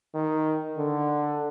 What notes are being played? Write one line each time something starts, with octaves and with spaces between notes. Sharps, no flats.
D#3
D3